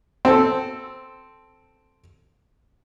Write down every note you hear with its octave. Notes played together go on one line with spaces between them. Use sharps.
C4 A4